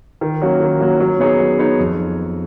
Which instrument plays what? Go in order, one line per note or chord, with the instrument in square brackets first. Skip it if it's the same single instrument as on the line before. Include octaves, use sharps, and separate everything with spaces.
[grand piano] D#3
F#3 A#3 C#4 F#4
D#3
F#3 A#3 C#4 F#4
F#3
B3 D#4 G#4 C#5
F#3
B3 D#4 G#4 C#5
F2